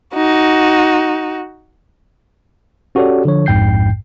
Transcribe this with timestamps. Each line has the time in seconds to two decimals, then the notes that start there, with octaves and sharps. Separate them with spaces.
0.14 D#4 F#4
2.95 C#4 F#4 G4 A4 C#5 D5
3.25 D3 F3 C#5
3.46 A#1 F2 G#2 G5 G6 C7